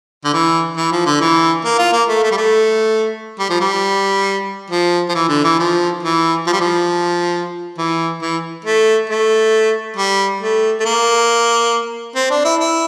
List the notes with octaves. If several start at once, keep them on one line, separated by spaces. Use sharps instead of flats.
D3
E3
E3
F3
D3
E3
A#3
F4
A#3
A3
A3
G3
A3
G3
F3
G3
F3
F3
E3
D3
E3
F3
E3
F3
G3
F3
E3
E3
A3
A3
G3
A3
A3
A#3
C4
D4
E4
E4